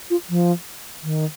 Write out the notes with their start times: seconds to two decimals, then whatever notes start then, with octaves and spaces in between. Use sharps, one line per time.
0.10 F4
0.30 F3
1.03 D#3